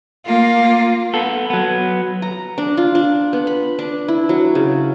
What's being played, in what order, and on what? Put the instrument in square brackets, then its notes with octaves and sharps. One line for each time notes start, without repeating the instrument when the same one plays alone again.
[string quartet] A#3 F4
[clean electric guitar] B3 A4
F#3 B3
[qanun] A#5
D4
F4
D4
B3
B5
D4
E4
F#3
C#3